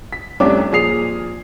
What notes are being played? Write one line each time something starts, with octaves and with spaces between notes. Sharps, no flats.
B6
F1 C2 C#4 D4 C#5 D6
A#2 F3 G#4 D#6 C7 F7